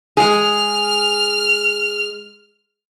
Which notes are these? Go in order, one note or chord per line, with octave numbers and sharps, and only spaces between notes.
G#3 G#4 F6